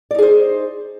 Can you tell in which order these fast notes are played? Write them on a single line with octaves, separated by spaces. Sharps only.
D5 D#4 G#4 C5